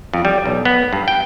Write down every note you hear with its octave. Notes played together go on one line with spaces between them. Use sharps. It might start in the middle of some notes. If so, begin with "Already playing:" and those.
F2
G3
B1
B3
G2
G5